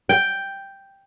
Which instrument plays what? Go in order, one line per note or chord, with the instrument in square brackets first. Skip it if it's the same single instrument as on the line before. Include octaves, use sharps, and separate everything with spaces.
[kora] G5